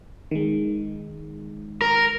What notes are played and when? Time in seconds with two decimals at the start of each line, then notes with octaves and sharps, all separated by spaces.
0.31 D#3 G#3
1.82 A#4